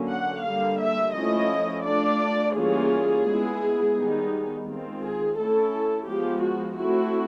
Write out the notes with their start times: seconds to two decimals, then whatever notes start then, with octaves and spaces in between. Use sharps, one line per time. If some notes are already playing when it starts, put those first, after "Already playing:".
Already playing: D3 F#3 A#3 C#4
0.09 F#5
0.44 D3 G3 A#3 F5
0.79 E5
1.14 F3 A3 C#4 E4 D#5
1.85 A3 D4 F4 D5
2.55 E3 G3 A#3 C#4 F4 G#4
3.25 G#3 B3 E4
3.96 D#3 G3 B3 D#4
4.66 D#3 G#3 C4 F4
5.01 G#4
5.36 A3 C#4 E4 A4
6.07 F3 G#3 B3 G4
6.42 F#4
6.77 A3 C4 E4 F#4